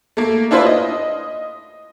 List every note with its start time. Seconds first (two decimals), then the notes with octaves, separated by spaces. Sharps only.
0.17 A3 A#3
0.51 D4 E4 F4 B4 C5
0.66 D#5